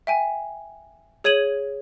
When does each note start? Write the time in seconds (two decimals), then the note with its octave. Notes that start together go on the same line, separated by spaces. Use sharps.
0.07 E5 G5 G#5
1.24 G#4 C#5 G#6 D#7 F#7